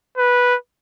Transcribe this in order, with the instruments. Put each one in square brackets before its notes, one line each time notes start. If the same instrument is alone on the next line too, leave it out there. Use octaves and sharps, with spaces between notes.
[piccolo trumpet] B4